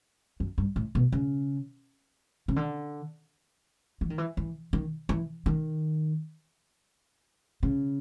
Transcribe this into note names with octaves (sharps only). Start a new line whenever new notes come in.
F#2
G2
A2
B2
C#3
C#3
D3
E3
D#3
E3
E3
D#3
E3
D#3
C#3